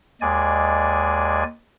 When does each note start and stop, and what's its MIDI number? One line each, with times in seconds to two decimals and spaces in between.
0.21 1.43 39
0.21 1.43 56
0.21 1.43 74
0.21 1.43 80